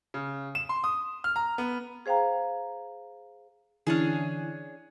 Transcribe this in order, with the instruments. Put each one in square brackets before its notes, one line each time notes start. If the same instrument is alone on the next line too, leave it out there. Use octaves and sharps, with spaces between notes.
[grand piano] C#3
E7
C6
D#6
F6
A#5
B3
[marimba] G#4 C5 F5 G5 A#5
[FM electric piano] D3 E3 E4 [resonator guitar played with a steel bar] C#4 D4 G#4